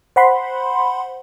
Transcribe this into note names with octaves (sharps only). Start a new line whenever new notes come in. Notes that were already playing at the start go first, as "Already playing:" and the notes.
C5 F#5 B5 C6